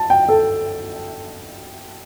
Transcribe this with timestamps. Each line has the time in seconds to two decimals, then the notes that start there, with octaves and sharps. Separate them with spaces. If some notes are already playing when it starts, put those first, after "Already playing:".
Already playing: A5
0.10 G5
0.29 A4